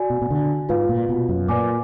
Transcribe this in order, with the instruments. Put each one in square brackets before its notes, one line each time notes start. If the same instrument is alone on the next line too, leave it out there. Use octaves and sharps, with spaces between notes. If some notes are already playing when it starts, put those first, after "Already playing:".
Already playing: [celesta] F#4 D5 G#5
[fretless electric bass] B2
B2
D3
[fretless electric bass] G#2 [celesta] F4 B4 F5
[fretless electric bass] A#2
B2
F#2
[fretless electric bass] A#2 [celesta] B4 D5 G#5 D6